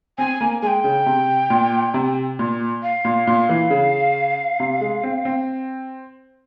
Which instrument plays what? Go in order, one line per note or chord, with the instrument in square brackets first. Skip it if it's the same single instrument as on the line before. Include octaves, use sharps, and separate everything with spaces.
[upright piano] C4 [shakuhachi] G#5
[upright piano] A#3
[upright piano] G#3 [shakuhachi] G#5
[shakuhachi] G5
[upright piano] C#3
C3
A#2
C3
A#2
[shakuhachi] F5
[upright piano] A#2
A#2
E3
C#3
C3
G#3
C4
C4